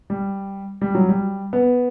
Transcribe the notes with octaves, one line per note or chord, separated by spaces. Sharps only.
G3
G3
F#3
G3
B3